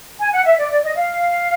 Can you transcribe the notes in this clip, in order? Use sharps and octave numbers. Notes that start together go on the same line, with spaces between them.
G#5
F#5
E5
D5
D5
D#5
F5